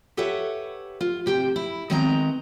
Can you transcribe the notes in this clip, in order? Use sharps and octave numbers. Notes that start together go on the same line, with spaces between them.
G4 A4 B4 C#5 E5 F#5
F4
C3 G4 C5 G5
E4
D#3 G#3 B3 C4 D#5 A#5